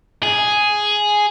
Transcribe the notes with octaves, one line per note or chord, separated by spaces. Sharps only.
G#4